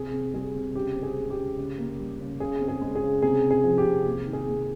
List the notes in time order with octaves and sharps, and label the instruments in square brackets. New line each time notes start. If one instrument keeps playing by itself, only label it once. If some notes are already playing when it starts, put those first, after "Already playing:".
Already playing: [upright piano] C3 G#4
C4
G3 G#4
C3
C#3 G4
C4
G#4
G#3
G4
C#3
C#3
A#3
G3
C#3
C#3 G#4
C4
G#4
G#3
G#4
C#3
C3 G#4
C4
G#4
F3
G4
C3
A#3
D#3
G#4
A#3